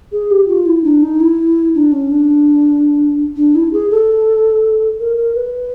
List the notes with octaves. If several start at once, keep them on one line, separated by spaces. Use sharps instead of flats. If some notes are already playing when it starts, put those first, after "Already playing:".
G#4
G4
F4
E4
D4
D#4
E4
D4
C#4
D4
D4
E4
G#4
A4
A#4
A#4
B4